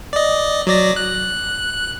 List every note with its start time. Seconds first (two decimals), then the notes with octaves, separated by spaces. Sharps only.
0.13 D5 D#5
0.67 F#3 D5 A#6
0.96 F#6